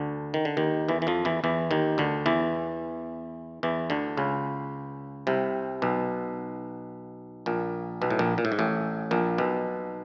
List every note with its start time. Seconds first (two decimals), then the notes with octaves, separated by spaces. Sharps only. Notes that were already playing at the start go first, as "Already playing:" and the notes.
Already playing: D2 D3
0.34 D#3
0.45 D3
0.57 D#2 D#3
0.89 E2 E3
1.02 E3
1.07 F2 F3
1.25 E2 E3
1.44 E2 E3
1.71 D#2 D#3
1.98 D2 D3
2.26 E2 E3
3.63 E2 E3
3.90 D2 D3
4.17 C#2 C#3
5.27 C2 C3
5.82 B1 B2
7.46 A#1 A#2
8.02 B1 B2
8.10 A2
8.19 A#1 A#2
8.38 A#2
8.45 A2
8.52 G#2
8.59 A1 A2
9.11 A#1 A#2
9.38 B1 B2